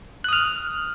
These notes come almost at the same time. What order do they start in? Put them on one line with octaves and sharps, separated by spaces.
F#6 D#6 F6